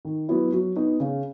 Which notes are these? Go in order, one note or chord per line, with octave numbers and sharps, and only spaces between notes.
D#3
F#3 B3 E4
F#3
B3 D#4
C#3